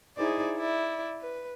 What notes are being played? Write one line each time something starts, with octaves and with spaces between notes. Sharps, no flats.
D#4 E4 G#4 C5 D5
E4 D5
B4